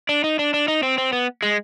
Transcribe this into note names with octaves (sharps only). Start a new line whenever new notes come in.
D4
D#4
D4
D4
D#4
C4
C4
B3
G#3